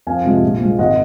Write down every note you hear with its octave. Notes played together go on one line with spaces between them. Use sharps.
F2 F5 G#5
C3 F3 G#3
A#1
A#2 G#3
G#1 D#5 F#5